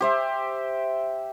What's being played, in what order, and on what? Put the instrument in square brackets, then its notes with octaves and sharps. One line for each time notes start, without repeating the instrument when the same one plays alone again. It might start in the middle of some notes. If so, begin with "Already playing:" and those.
[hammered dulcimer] G4 C5 E5